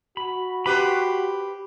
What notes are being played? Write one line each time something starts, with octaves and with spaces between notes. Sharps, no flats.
F#4 B5
G4 B4 B5 C6